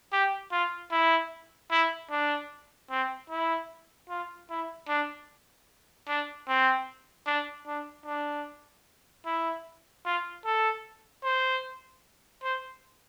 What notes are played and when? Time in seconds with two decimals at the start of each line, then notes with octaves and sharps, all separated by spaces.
0.12 G4
0.52 F4
0.92 E4
1.71 E4
2.11 D4
2.90 C4
3.30 E4
4.09 F4
4.49 E4
4.88 D4
6.08 D4
6.48 C4
7.27 D4
7.67 D4
8.06 D4
9.25 E4
10.05 F4
10.45 A4
11.24 C5
12.43 C5